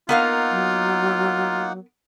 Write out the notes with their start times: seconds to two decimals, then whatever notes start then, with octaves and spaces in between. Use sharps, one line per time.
0.09 A#3 B3 D#4 F4 A#4 F5 F#5
0.50 F#3